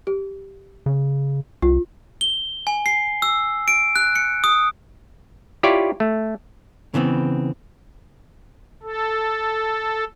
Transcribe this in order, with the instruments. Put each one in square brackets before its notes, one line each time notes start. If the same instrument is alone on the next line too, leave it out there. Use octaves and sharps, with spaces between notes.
[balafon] G4
[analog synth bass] C#3
[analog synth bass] C2 [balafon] F4
[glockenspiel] G7
G#5
C7
E6
D7
F#6
C#7
D#6
[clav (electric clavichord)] E4 F4 G4 C#5 D5
A3
[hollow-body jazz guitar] C#3 E3 B3 C4
[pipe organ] A4